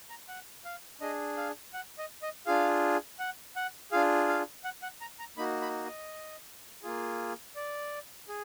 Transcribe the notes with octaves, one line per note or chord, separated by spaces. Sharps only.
A#5
F#5
F5
D4 G#4 D#5
F5
F#5
D#5
D#5
D4 F4 G#4 F5
F#5
F#5
D4 F4 G#4 F5
F5
F#5
F#5
A#5
A#5
A#3 D#4 F#4 B5
B5
D#5
A#3 F4 G#4
D5
G#4